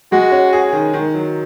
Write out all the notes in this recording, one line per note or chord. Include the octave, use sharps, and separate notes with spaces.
G#3 F#4
C#4
G#4
D#3
D#3
F#3